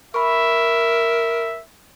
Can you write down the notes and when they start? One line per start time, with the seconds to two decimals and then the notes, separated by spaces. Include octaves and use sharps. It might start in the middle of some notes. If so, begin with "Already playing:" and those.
0.14 A#4 E5 B5 C#6